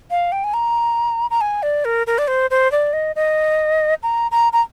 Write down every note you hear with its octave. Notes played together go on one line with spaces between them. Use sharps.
F5
G5
G#5
A#5
A#5
G#5
D5
A#4
A#4
D5
C5
C5
D5
D#5
D#5
A#5
A#5
A#5